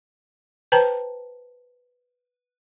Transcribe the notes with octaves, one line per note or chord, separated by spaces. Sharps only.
B4 C5 G5 A5 A#5